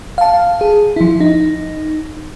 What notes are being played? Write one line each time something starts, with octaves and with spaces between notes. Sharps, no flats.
F5 A5
G#4
F3 E4
D#4